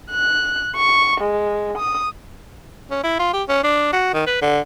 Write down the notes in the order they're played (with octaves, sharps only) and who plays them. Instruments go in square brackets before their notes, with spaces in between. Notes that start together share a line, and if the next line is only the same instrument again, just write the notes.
[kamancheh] F#6
C#6
G#3
D#6
[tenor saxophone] C#4
E4
F4
G4
C#4
D4
F#4
D#3
B4
D3